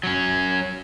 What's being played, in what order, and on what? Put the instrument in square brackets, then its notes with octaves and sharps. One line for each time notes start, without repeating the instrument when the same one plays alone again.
[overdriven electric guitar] F#3 C#4